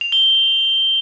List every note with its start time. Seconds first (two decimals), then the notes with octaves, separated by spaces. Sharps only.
0.01 F7
0.12 G7
0.24 G7